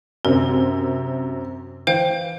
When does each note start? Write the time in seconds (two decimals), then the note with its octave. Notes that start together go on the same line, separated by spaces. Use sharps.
0.25 F#2 C3 C4 A#4
1.87 E3 C5 F5 G5 G6